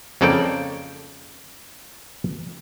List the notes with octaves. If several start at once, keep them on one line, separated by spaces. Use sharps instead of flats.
F2 C#3 A#3 A4 D5 G5